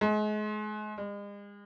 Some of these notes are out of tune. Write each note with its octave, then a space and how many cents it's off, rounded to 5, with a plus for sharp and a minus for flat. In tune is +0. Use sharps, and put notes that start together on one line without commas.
G#3 +35
G#3 -40